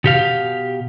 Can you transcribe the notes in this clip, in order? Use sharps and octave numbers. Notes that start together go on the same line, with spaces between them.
B2 G4 F5